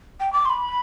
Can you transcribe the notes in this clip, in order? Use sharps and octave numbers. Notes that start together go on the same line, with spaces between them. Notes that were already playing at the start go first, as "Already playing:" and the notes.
G5
D6
C6
B5